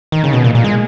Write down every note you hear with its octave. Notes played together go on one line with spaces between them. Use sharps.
D#3
C#3
B2
A#2
A#2
G#3